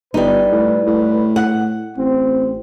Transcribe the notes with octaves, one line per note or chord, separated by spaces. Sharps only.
G1 G3 D#4 B4
A2
A2
F#5
A1 C4